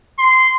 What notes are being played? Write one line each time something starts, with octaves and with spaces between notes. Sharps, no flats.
C6